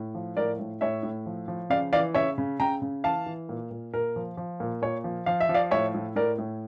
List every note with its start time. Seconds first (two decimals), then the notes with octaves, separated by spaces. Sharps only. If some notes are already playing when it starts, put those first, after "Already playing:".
Already playing: A2
0.15 F3
0.37 A2 A#4 D5
0.59 A2
0.81 A2 C#5 E5
1.03 A2
1.26 F3
1.48 F3
1.70 C#3 D5 F5
1.93 E3 D5 F5
2.15 C#3 C#5 E5
2.38 C#3
2.60 C#3 G5 A#5
2.82 C#3
3.04 E3 F5 A5
3.26 E3
3.49 A#2
3.71 A#2
3.93 A#2 A#4
4.16 F3
4.37 F3
4.60 A#2
4.82 A#2 C#5
5.04 F3
5.26 F3 F5
5.40 E5
5.49 F3
5.54 D5 F5
5.71 A2 C#5 E5
5.94 A2
6.16 A2 A#4 D5
6.38 A2